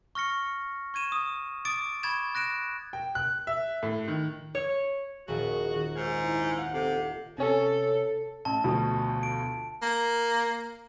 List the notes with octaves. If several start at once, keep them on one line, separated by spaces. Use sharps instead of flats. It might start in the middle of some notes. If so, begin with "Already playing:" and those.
C#6 F6 A#6 C#7
C#6 G#6 D#7 E7
D#6
D6 D#6 A6 D7
B5 C#6 D6 G#6 A6 E7
F#6 A#6 D7 E7
G5
F#6
E5
A2
D#3
C#5
D#1 A#1 A#2 F#4 G#4
D#3
G#2 F6 G#6
E4
D#4 F5 F#5
C3 A4 C#7
C3 C#4 A4
A1 A5
D2 B2 F3
D7
A#3